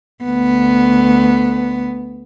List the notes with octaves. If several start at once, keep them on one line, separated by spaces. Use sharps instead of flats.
D2 B3